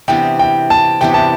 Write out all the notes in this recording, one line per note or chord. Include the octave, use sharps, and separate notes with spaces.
C3 E3 B3 D4 G5
G5
A5
C3 E3 B3 D4 G5
A5